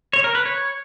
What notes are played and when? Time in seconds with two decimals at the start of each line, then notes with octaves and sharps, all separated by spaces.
0.13 C#5
0.24 A#4
0.35 B4
0.45 C#5